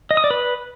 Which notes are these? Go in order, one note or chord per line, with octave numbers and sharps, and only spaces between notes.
D#5
D#6
D5
B4